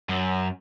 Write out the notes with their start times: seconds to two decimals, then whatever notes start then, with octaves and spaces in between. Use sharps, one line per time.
0.09 F#2